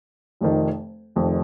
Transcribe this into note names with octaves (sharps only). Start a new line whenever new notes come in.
F1 F2 D#3
F1 F2 D#3